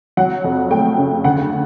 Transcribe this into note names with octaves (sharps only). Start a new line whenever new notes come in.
F#3 F#5
F2
A3 G5
C#3
D2 F#5